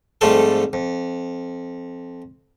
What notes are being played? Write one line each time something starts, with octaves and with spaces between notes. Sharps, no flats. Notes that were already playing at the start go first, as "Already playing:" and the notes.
F2 G#2 G3 A3 F4 A4
F2